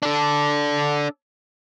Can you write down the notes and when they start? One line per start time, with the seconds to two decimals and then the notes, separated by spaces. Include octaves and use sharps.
0.03 D4 A4